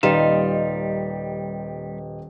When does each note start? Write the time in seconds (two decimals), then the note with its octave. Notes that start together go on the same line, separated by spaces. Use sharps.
0.03 D#1 G3 D#4 F4 G4 B4 D#5 E7